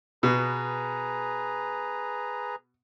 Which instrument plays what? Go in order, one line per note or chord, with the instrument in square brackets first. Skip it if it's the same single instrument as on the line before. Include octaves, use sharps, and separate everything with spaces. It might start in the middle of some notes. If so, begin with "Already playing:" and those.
[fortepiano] B2 [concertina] G#4 B4 A#5